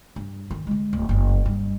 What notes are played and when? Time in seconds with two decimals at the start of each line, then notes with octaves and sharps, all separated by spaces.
0.16 G2
0.51 D#3
0.67 D3 G#3
0.93 D1
1.09 F#1 F2
1.46 G2